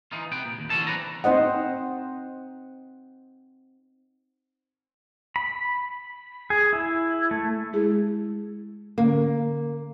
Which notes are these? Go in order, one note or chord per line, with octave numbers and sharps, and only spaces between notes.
E3 D#4 F4
C3 B3 G5
A#2
D#2
D3 E3 F3 C#4 A4 A5
C2 C4 D4 B4 D5 A#5
C4 D#4 C5 D#5 F#5
B5
G#4
E4
A3
G#3 E4 G#4
D3 A#3 C#4